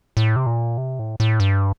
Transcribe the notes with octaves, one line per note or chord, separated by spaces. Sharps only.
A2
C3
A#2
C3
A2
A2
G2